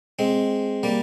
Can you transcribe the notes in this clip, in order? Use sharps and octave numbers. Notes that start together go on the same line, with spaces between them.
G#3 C4
G3 A#3